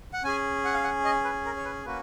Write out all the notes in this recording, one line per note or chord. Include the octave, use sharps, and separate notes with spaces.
F#5
C#4 G#4 G#5
F#5
F5
F#5
D#5
B4
A#4
C#5
B4
A#3 C#4 F#4 B4